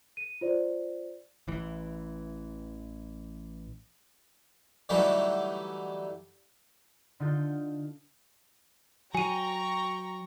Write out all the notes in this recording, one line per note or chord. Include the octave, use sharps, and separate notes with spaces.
D#7
F4 C5 D5
A1 E3
D3 E3 F#3 G3 A3 D#4
D3 D#4 F4 A4 G6
F#3 G5 G#5 A#5 C#6 D#7